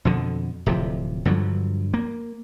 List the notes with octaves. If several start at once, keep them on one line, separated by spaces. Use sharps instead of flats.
F2 B2 D3
D1 C3 F3
G2 D3 F3 F#3
A#3